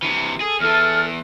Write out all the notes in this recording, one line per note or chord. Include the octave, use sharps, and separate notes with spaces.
C3 E3
G#4 A4
E2 E3 A4 F6